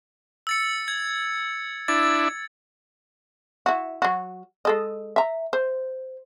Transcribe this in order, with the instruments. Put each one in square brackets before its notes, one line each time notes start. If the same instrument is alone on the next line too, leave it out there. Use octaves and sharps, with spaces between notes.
[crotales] E6 A6 C#7
G#6
[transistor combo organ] D4 E4 [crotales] A6
[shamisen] E4 F#4
F#3 F#4
G#3 A4 D#5
E5 A#5
C5